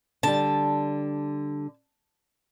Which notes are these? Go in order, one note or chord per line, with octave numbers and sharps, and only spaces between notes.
D3 G3 A5